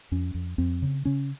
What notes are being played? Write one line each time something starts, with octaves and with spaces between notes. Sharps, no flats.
F2 C#4
F2
F2 C4
C#3
C#3 C#4